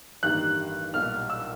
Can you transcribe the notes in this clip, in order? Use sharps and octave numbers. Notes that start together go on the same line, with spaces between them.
A1 G2 D#3 G3 A#3 F#6
B1 A#2 G3 F6
E6